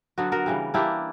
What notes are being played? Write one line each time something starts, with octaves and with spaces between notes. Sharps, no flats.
D3 F#3 B3 F#4
F#4 A#4
C#3 E3 G3
E3 A#3 D4 E4 G4